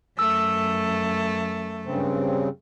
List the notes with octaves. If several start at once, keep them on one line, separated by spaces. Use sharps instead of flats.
F#2 A3 E6
G2 C#3 C4